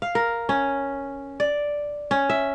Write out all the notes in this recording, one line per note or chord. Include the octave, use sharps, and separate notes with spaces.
F5
A#4
C#4
D5
C#4
E5